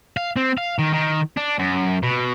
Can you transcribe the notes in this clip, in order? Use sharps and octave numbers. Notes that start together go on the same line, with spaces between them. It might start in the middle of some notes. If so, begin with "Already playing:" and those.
F5
C4
F5
D#3
D#3
D4
F#2
B2